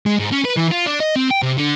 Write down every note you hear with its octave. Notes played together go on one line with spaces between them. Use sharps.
G#3
G#2
C#4
B4
E3
F4
D4
D#5
C4
G5
C3
D3